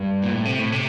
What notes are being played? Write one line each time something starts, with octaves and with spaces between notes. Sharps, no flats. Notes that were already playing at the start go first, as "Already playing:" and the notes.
Already playing: G2
A#2
A2
C3
A2
C3